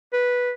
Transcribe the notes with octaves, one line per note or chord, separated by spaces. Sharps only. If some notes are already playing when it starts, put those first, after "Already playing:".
B4